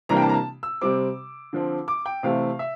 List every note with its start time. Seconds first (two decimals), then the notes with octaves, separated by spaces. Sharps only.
0.09 C3 E3 G3 A#3 D4 A#5
0.16 G5
0.22 A5
0.29 A#5
0.34 A5
0.63 E6
0.81 C3 G3 C4 D6
1.53 D3 F3 C4
1.88 D6
2.06 G5
2.23 C3 E3 A3 C4 F5
2.59 E5